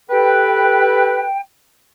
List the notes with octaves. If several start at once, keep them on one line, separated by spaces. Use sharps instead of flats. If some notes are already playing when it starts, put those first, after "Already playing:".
G4 A4 B4 G5